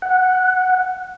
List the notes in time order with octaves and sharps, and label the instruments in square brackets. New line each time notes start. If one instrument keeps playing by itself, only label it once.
[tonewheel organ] F#5